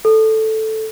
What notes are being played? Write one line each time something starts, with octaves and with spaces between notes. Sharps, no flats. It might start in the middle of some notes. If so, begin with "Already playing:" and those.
A4